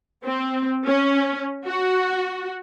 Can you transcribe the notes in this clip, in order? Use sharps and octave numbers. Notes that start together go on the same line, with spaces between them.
C4
C#4
F#4